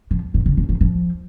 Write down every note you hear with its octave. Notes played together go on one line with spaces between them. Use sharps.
F3
D#3
C#3
B2
E3
F3